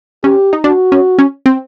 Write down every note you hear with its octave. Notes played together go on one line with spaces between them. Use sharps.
C#4 G4
D#4
D4 F#4
C#4
C#4
C4